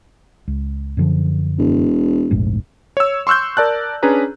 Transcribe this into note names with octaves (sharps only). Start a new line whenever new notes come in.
C#2
F#2 D3 F3
E1
F1 A#1 G#2
C#5 E6
C6 C#6 E6 F#6 G6
A#4 D5 A5 F#6
C#4 D4 G#4 B4 A#5